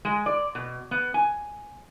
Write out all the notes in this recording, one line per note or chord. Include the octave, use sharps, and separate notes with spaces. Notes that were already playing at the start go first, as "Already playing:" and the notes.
G#3
D5
B2
B3
G#5